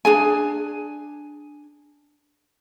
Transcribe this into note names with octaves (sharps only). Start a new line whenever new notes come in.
D4 G#4 G#5